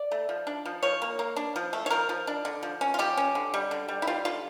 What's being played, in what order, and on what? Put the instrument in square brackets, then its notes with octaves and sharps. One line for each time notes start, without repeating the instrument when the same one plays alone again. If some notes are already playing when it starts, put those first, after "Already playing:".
Already playing: [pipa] D5
A3
F3
D4
F3
F3 C#5
A#3
A#3
D4
F3
A3
C#5
F3 A#4
F3
D4
D3
F3
C#4
F4
F3 G4
C#4
D3
G3
D3
G3
E4
G3 F4
D3 F4